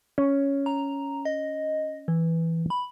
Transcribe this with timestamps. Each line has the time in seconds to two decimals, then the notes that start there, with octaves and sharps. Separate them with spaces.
0.18 C#4
0.66 A#5
1.25 D#5
2.08 E3
2.70 B5